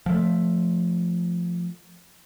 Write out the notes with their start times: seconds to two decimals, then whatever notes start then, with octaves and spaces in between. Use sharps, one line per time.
0.06 F3 A3